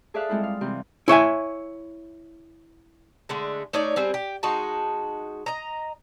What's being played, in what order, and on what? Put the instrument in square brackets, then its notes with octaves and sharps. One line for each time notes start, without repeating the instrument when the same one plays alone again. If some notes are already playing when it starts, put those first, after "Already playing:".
[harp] G#4 A4 D5 E5 F5 F#6
G3 G#3 C4 E4 F4
F5
C3 E3 G3 C4
[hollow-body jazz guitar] E4 C#5 E5 G#5
[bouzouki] D3 G#3 A3
A3 D#4 C#5 D5
G3 C4 G#4
G4
G#3 D#4 F#4 A5
D#5 A#5